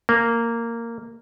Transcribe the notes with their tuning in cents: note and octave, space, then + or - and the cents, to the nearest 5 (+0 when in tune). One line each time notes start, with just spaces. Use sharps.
A#3 -10